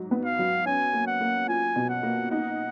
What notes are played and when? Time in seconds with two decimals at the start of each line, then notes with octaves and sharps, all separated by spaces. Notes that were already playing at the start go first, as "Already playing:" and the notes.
Already playing: G#2 F#3
0.11 B3
0.25 F5
0.39 F#3
0.66 C#4 G#5
0.93 A#3
1.07 F#5
1.21 A#3
1.48 F4 G#5
1.76 B2
1.89 F#5
2.03 A#3
2.31 D#4 F#5